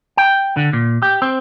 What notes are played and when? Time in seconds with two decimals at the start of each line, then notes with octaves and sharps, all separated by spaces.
0.17 G5
0.57 D3
0.73 A#2
1.02 G4
1.22 C4